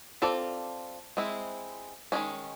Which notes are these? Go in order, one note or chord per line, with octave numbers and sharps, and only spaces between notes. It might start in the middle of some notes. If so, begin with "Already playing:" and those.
C4 F4 A4 D5
G#3 C4 E4
D#3 G#3 C#4